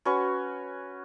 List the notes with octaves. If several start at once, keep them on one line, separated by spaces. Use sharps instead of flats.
C#4 F#4 B4 C#6